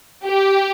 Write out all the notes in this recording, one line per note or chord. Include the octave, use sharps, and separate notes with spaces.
G4